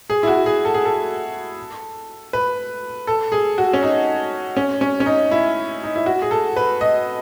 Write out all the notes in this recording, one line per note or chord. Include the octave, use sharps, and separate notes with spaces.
G#4
E4
F#4
G#4
A4
G#4
A4
B4
A4
G#4
F#4
C#4
D#4
C#4
C#4
C#4
D#4
E4
D#4
E4
F#4
G#4
A4
B4
D#5